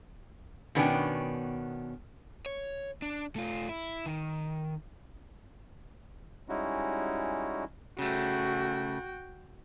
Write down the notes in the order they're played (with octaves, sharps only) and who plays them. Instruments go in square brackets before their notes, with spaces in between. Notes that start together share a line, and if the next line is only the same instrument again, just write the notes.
[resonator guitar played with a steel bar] B2 D#3 B3 C#4 D4 G5
[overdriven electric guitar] C#5
D4
A3 F4
E4
D#3
[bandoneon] G3 G#3 C#4 D#4 E4 F#4
[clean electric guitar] C#3 A3 [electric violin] F#4 G5